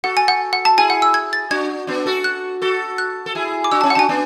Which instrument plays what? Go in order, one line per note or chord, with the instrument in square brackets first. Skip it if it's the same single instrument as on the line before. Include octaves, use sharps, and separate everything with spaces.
[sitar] F#4 A4 [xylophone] F#5
[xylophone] G#5
F#5
F#5
A5
[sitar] E4 G#4 [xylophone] G#5
[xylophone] F#5
E6
G#6
A6
[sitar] D4 F#4 [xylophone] G#6
[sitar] B3 D4
F#4 A4
[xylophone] F#6
[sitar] F#4 A4
[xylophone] F#6
[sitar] A4
E4 G#4
[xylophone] D6
[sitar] D4 F#4 [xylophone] E6
[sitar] C#4 E4 [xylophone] A5
[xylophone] F#5
[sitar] D4 F#4 [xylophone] G#5 A5
[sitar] B3 D4